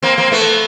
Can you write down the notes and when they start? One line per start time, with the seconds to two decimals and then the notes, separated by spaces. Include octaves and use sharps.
0.03 A#3 C4
0.18 A#3 C4
0.32 A3 B3